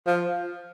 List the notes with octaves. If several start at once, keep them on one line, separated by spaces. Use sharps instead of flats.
F3